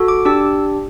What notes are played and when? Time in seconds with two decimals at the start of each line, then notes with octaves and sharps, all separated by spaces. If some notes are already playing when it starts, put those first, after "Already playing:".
Already playing: F#4 A4
0.08 D6
0.25 D4 G4 E6